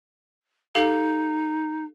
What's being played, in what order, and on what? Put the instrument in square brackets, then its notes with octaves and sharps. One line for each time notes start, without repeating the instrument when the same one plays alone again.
[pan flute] D#4 [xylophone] G4 A4 F5